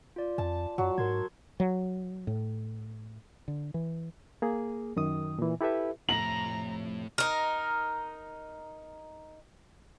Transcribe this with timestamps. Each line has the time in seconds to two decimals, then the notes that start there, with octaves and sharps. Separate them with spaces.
0.16 F4 D5
0.38 F2 A5
0.78 F#2 F#3
0.98 G#2 A#4 C6 G#6
1.60 F#3
2.27 A2
3.48 D3
3.74 E3
4.42 A#3 G#4
4.96 F#2 D#3 D#6
5.39 A#2 E3
5.61 E4 G4 A4 B4 E5
6.09 F2 A2 C3 F3 A#5 F#7
7.18 D#4 A#4